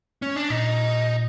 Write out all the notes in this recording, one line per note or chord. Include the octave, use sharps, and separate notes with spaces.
C#4
D4
A#2 D#4